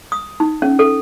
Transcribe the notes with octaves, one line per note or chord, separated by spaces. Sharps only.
D#6
D#4
C#4
A4